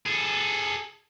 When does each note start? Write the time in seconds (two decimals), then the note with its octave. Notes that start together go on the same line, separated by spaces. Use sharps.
0.06 G#4 A4